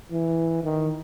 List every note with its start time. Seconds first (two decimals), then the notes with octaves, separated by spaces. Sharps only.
0.11 E3
0.63 D#3